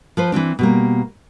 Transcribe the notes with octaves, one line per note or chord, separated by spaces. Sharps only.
F3 B4 C5
E3 G3 C4 D4
B2 G3 A#3